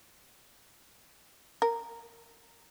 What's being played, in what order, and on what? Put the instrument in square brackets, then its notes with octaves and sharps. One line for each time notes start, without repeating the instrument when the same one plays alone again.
[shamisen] A#4